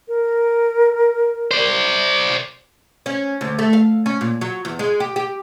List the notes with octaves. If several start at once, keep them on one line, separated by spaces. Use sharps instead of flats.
A#4
C5 D5
C#4
D2
A3
F5
C#4
A#2
F#3
E2
G#3
G4
G4